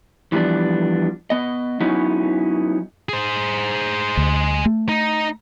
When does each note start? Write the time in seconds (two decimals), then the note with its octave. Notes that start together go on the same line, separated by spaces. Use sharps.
0.32 E3 F3 G3 B3 D4
1.30 B3 D#5
1.81 F#3 B3 C#4 D#4 E4 F#4
3.09 G#4 C5
4.17 D2
4.66 A3
4.89 D#4